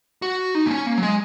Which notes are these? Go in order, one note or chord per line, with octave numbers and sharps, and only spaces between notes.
F#4
D#4
A#3
C#4
A#3
F#3
G#3